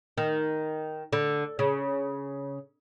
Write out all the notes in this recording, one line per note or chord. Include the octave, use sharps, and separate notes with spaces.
D#3
D3
C#3